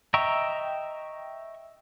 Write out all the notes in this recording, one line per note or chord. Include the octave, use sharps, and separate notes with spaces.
D#5 E5 G5 A#5 C#6